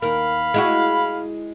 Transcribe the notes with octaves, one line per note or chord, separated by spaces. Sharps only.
D#2 A#4 F5 B5
G#3 E4 F#4